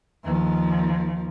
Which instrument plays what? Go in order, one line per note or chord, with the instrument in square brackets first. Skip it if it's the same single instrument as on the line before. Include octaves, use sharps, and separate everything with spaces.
[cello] D#2 F3